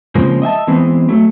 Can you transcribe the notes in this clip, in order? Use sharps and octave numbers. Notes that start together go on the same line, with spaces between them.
C#3 F3 G#3 A#3 C4
D#5 E5 G5 A5
E3 G#3 B3 C4
F#3 A3